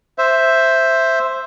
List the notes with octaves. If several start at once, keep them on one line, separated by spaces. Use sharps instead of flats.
C5 E5